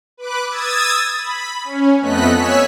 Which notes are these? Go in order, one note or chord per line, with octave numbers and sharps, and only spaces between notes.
B4 D6 F#6
D#6 E6 G#6 A6
B5
C#4
F2 A3 B3 D#5 F#6 B6
C#5 G#5 E6 F#6 B6